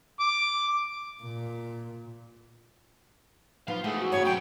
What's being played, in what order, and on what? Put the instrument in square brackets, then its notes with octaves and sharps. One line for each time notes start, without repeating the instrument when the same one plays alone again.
[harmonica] D6
[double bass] A#2
[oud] F3 F#3 B3 [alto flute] D#4 [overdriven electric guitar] F4 F5
[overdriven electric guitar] E2 [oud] A3 [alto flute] G#4
[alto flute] F#4
[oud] G2 C#3 [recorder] C#5
[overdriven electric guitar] F#3 B3 [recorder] G5